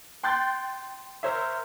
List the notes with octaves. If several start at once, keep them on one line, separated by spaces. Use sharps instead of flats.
G5 C6 F#6 G6 A6
A#4 C5 C#5 E5